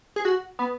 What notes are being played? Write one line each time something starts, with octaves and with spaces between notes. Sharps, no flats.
G#4
F#4
B3